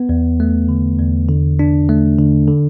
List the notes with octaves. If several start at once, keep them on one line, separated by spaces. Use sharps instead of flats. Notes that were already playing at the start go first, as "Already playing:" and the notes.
Already playing: B3
E2
A3
D3
E2
D3
D4
A3
D3
D3